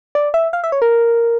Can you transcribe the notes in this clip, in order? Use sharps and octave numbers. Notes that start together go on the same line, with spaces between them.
D5
E5
F5
E5
C#5
A#4